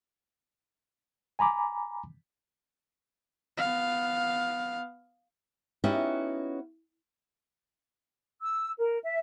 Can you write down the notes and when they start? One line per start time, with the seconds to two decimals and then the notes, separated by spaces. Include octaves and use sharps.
1.39 G#5 A#5 B5 D6
3.57 B3 F5
5.84 B3 C#4 D#4 E4 F#4 G4
8.41 E6
8.78 A#4
9.03 E5